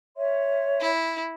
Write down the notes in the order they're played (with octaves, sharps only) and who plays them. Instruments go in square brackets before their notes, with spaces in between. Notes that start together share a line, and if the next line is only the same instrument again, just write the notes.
[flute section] C#5 E5 C6
[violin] E4